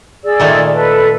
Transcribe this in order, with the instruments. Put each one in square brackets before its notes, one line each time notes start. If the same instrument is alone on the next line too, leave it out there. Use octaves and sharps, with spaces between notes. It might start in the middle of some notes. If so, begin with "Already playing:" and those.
[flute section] G#4 D5 E6
[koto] A#2 D#3 A3
[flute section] A4 B4